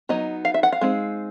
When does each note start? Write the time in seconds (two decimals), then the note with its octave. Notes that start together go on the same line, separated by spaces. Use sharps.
0.09 F#3 B3 D#4 D#5
0.45 F5
0.54 E5
0.63 F#5
0.72 F5
0.81 G#3 C4 D#4